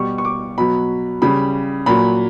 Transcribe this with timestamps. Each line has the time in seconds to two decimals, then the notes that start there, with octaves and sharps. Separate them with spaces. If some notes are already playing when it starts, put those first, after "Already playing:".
Already playing: B2 G3 C#6
0.18 C#6
0.25 D6
0.58 B2 F#3 B5
1.22 C#3 G3 B5
1.86 A#2 F#3 B5